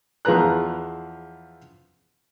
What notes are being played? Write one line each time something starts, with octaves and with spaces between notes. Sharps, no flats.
E2 F3 G#4 B4 A#5 F#6